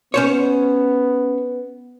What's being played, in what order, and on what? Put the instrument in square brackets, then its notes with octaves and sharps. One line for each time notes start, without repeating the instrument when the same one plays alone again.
[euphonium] B3 [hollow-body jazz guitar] C#4 C5 C#5